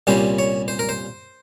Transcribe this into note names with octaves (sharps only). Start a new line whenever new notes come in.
C2 A#2 G3 C#4 C5
C#5
C5
A#4
C5